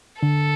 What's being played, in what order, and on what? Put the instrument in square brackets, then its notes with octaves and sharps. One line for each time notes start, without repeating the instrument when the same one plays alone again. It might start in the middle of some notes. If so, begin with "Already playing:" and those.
[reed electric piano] D3 [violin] A4